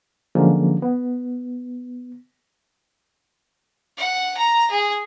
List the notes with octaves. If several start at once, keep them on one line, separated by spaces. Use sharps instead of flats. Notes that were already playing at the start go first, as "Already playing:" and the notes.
D3 F3 F#3 G#3 A#3 C#4
B3
F#5
A#5
G#4